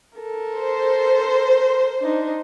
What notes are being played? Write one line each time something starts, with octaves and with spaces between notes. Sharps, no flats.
A4 A#4
C5
D4 D#4